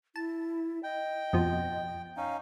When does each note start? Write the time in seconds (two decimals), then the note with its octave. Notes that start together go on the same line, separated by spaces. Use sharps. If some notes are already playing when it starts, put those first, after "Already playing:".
0.16 E4 A5
0.83 D#5 G5
1.33 F2 B2 F3
2.17 C#4 D#4 F5